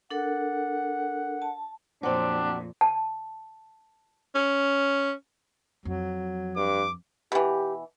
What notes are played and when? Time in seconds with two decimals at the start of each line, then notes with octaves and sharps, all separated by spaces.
0.11 D4 A4 A#4 F#5
1.42 A5
2.03 F2 A#2 F#3 C4 D4
2.81 A5
4.35 C#4
5.85 F2 F#3
6.56 G2 D6
7.32 B2 E3 G4